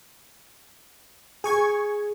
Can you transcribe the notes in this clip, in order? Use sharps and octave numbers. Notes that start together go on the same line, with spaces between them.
G#4 G#5 C#6 G#6